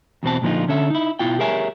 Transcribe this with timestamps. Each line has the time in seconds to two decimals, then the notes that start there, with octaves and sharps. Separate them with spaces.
0.23 E2 B2 C4 A5
0.42 A#2 D3 F3 B3 D#4 F4
0.68 D3 C#4 A4 E5
0.90 D#4 E4
1.19 B2 D#3 E4 F4 G5
1.39 G4 G#4 A#4 C#5 E5 G#5